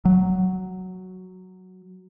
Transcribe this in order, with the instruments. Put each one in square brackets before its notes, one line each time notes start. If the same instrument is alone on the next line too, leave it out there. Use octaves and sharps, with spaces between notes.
[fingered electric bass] F#3